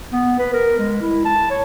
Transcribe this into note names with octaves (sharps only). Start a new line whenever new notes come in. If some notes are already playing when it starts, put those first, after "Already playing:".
B3
B4
A#4
G#3
E4
A5
C#5